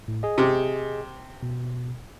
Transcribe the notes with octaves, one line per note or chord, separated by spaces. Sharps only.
A2
G#4 D#5
C3
B2